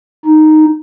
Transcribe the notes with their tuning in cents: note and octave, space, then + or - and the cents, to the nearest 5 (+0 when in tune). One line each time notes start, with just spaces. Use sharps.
D#4 -5